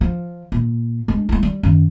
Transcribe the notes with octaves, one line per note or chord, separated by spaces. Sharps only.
F3
A#2
G#3 D4
G#3 E4
G3
F#2 D#3